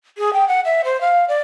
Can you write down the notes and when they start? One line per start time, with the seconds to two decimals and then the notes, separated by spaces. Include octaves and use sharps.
0.18 G#4
0.33 G5
0.48 F#5
0.65 E5
0.84 C5
1.01 F5
1.28 D5